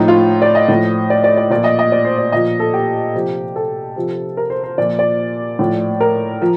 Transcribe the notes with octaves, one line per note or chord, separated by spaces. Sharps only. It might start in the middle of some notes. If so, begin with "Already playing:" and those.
Already playing: A2 F3 D#4
F4
D5
D#5
A2 F3
D5
D5
D5
A#2 F3 D5
D#5
D#5
D5
C5
D5
A#2 F3 D#5
A4
G4
C3 F3
A4
C3 F3
A#4
C5
C5
A#2 F3 D5
D5
A2 F3
A#4
F3